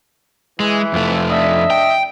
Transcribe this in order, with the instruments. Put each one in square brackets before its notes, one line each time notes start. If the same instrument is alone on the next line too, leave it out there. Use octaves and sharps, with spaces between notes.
[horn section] E3 [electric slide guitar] G#3
[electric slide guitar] F2 A3
[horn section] D4 D#5 E5
[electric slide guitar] G5